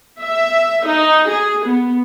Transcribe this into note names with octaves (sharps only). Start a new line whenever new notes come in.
E5
D#4
G#4
B3